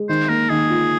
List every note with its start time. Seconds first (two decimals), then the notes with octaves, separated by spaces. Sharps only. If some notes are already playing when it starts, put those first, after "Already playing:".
Already playing: G#3
0.09 D#3 C5
0.29 A#3 A#4
0.49 D#3 G#4
0.70 F4